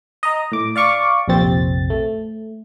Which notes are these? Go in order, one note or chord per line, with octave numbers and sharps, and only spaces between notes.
D#5 A#5
A2 D6
D5 F5 C#6 D6
A#1 F2 C3 C4 A6
A3